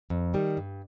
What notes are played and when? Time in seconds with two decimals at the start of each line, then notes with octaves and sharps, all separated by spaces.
0.10 F2
0.34 D#3 G3
0.57 G2